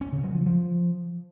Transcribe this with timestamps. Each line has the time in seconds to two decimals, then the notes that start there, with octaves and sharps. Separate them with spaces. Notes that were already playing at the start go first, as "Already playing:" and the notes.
0.01 C#4
0.12 C#3
0.24 F#3
0.35 F3
0.46 F3